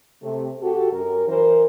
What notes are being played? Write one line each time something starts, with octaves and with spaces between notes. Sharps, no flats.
C3 A3
F#4 G4 A4
F#2 A#4
E3 A#4 C5